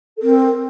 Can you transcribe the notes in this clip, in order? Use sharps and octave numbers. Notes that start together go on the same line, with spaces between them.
A4
C4 A#4